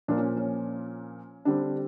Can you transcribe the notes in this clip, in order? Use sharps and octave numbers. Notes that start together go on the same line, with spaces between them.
A#2 F3 A#3 D4
C#4
C#4
D3 G3 C4 D4